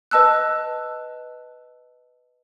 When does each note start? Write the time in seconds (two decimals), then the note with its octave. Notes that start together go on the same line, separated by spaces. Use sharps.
0.11 B4 D#5 A5 E6 F#6